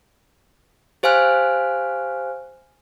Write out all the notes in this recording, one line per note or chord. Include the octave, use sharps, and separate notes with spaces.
G4 C5 F5 G#5 F6 F#6